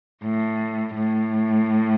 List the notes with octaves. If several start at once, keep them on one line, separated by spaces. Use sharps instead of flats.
A2
A2